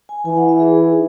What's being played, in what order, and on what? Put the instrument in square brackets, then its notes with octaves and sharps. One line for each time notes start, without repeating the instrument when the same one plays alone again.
[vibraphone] G#5
[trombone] E3 [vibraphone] G#5
[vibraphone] F#5
E5
G#4
D#4